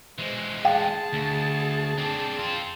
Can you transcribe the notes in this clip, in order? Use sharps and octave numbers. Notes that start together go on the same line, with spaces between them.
E3 G#3 C5
G#4 F5 G5 A5
D2
C4 D4
C4 F4